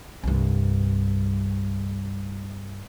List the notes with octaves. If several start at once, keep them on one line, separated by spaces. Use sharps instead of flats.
C2 G2